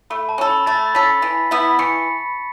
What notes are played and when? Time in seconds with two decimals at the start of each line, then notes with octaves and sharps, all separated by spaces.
0.10 A3 B5
0.29 A5
0.38 C#4 A4
0.47 B5
0.66 A3 A5 A6
0.95 C#4 A4 B5 B6
1.22 E3
1.51 B3 E4
1.79 E3 C#6 C#7